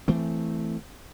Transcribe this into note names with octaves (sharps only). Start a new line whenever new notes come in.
E3 A3 C4